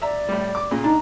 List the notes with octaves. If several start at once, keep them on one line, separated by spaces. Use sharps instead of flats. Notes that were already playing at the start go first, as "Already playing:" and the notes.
D5 E5 A#5
A2 G3
D6
A#2 C#3
D4 D#4 A#5